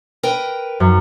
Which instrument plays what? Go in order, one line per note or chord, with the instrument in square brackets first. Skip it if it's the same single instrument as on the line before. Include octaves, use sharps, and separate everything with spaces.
[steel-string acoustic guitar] A#4 B4 G5
[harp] F#2